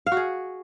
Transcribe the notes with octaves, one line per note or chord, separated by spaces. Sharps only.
F5
F#4
G#4